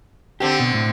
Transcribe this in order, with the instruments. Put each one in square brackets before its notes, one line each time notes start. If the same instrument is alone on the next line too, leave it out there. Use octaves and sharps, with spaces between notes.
[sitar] D3 C4 D4 [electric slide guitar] G4
[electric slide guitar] B2
A2